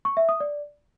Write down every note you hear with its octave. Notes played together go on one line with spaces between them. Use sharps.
C#6
E5
D#6
D5